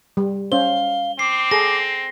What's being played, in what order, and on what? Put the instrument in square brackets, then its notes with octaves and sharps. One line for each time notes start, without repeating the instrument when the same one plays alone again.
[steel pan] G3
[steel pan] C#4 C5 [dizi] F5 [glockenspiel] G7
[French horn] C4 [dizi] D6 [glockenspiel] C7
[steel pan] G#4 A4 [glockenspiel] A#6